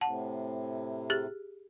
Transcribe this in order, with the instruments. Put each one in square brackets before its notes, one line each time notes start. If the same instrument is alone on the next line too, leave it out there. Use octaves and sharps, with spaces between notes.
[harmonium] A2 C3 [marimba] F#5 A5
[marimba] G4 G#4 A6